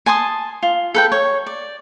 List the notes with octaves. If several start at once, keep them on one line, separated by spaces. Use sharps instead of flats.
G#5 A5 C6 D#6
F4
A4 B4 G5
C#5
D5